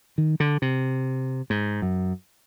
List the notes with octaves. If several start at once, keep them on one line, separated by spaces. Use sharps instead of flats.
D#3
D3
C3
G#2
F#2